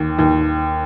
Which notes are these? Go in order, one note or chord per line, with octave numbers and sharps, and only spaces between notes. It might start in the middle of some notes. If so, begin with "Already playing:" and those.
Already playing: D#2
D#2